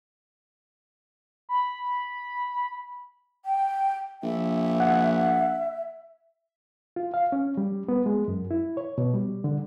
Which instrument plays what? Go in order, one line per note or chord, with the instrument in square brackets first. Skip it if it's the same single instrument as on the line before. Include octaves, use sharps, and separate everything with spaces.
[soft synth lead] B5
[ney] G5
[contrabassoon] A#1 [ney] E5
[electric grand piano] F#5
[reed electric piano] F4
F5
C#4
G3
B3
G#3
F#2
E4
C#5
B2
G3
D3